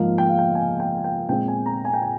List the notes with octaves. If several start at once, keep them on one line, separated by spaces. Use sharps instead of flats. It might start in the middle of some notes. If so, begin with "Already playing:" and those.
Already playing: G#2 F3 A#3 F5
G5
F5
G5
G#5
G5
G5
A#2 G#3 C4 G5
G#5
A#5
G#5
G5
G#5